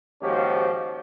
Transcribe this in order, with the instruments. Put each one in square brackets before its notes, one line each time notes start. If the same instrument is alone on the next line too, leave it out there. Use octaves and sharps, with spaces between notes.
[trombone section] D#2 G#2 F3 C#4 F#4 G4